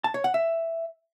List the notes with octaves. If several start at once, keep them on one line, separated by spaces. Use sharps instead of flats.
A5
C#5
F#5
E5